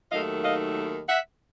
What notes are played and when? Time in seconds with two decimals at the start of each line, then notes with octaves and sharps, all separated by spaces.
0.11 D#2 D#3 F#3 A3 D#5 F5
0.44 D#5 F5
1.08 E5 F#5